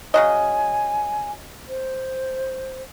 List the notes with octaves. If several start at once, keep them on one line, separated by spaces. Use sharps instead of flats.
C#3 F#3 D#5 G#5
C5